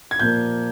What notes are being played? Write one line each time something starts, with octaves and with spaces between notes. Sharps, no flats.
G#6
A#2 F3 A#3 G6